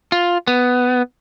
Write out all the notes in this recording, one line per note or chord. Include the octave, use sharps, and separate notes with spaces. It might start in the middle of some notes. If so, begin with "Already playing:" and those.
F4
B3